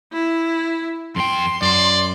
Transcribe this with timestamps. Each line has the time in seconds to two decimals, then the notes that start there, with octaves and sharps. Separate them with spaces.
0.13 E4
1.16 F2 G5 C6
1.62 F#2 D5